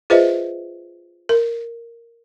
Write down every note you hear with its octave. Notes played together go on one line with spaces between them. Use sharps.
F4 G#4 B4 C5 D#5 E5
A#4